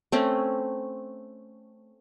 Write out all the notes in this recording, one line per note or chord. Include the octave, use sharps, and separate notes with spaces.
A3 C4 C#4